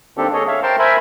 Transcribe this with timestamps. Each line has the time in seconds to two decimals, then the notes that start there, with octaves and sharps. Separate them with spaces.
0.17 D#3 A#3 C4 D4 G4 A4
0.33 G#4 A4 C#5 D#5
0.47 C#5 E5 F5
0.63 A#4 C5 G5 A5 C6
0.79 A#4 C5 E5 G#5 B5